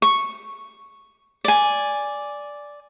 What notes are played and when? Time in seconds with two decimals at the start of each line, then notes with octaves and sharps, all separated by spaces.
0.02 C#6
1.44 D5 G#5